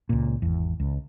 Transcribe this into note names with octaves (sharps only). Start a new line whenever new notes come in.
C#2 A#2
G#1 E2
C#2